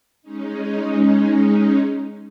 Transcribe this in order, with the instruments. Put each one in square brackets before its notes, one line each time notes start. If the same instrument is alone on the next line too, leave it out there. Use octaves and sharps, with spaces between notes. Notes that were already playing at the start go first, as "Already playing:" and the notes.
[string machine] G#3 C#4 D#4